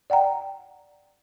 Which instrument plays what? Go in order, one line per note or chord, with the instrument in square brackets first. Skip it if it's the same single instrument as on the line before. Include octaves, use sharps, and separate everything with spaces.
[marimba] D5 F#5 G5 A#5